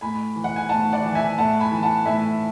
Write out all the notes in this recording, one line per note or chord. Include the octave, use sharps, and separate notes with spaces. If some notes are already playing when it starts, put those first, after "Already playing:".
A2 G#5 B5
E3
F#5
G#5
A2 F#5 A5
D5 F#5
E3
E5 G#5
A2 F#5 A5
G#5 B5
E3
F#5 A5
A2 E5 G#5